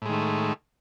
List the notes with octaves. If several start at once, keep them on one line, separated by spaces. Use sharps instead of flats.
A2 D#3 G#3 A3